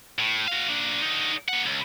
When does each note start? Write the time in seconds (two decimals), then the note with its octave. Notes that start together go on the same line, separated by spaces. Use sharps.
0.19 A2
0.48 F#4 F5
0.68 A#3 D4
1.02 D3 D#4
1.48 A#3 F#5
1.66 C#2